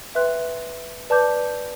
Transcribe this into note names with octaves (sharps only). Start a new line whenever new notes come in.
B4 E5 G5 C6 F#6
B4 D5 A5 D6 G6